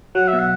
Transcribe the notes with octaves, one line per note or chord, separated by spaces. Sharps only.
F#3 F#5
B2 E5
F#5